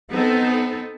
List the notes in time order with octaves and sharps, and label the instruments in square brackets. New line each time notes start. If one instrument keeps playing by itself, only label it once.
[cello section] B3 [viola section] C4 D#4 A4